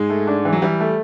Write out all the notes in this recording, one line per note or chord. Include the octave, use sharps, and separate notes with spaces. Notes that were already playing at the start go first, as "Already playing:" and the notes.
Already playing: G#2 G#3
A3
D4
E3
F#3
E3 G3
A3